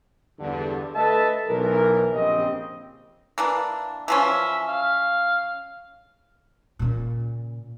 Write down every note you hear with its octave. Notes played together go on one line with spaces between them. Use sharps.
E2 G2 D3
A3 A4 B4 D#5 E5 A5
B1 E3 A#4
A#1 C#3 C4 G4 D#5
E3 A#3 D4
E3 F3 C#4 E5
F5
A#2 C#3